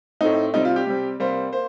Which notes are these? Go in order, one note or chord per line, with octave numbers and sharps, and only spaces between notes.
A2 A3 C4 D#4
C3 G3 C4 D#4
F4
G4
C3 G3 C4
C3 G3 A#3 C5
A#3 C5